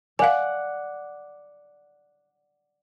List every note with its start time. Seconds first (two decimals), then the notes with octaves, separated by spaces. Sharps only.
0.19 D5 F5 F#5 G#5